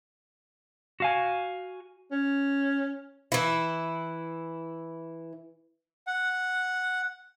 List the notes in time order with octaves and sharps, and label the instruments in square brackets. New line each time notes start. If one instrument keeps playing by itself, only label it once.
[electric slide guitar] F#4 F5 G#5
[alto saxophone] C#4
[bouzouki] E3 E4
[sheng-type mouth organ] F#5